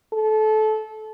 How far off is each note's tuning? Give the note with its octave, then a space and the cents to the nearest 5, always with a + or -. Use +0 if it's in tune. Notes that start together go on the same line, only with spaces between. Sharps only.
A4 -25